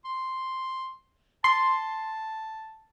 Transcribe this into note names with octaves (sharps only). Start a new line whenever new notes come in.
C6
A5 C6